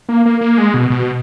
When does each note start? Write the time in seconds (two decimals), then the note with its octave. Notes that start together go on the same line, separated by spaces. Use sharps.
0.09 A#3
0.26 A#3
0.41 A#3
0.58 G#3
0.74 B2
0.90 B2